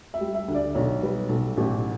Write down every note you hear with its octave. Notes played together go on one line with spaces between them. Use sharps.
E5
G3
E5
D2
D5
B1 C#5
G3 B4
B1 A4
A1 G4